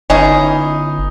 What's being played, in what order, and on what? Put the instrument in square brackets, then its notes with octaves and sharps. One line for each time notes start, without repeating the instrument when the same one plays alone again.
[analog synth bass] G1 [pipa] E3 C#4 G#4 [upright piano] D#4